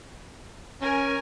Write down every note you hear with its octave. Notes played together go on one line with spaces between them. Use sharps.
C#4 A#4 G#5